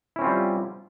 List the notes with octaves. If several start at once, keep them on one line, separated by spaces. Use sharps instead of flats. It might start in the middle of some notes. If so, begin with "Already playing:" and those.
G3 C4 C#4 E4 F4